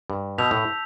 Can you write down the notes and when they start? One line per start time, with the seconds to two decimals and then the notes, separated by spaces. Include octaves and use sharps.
0.10 G2
0.38 B2 A5 E6 G6 B6 F7
0.51 A2